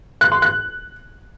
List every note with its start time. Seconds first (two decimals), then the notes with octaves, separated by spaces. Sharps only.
0.21 F#6
0.32 C6
0.42 F#6